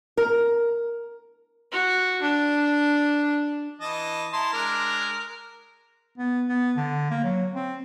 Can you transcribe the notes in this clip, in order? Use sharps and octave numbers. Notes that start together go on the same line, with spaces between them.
A#4
F#4
D4
E3 D#5 A5
E4 A5 A#5 C6
G#3 D4 A#4
B3
B3
D3
A#3
F#3
C4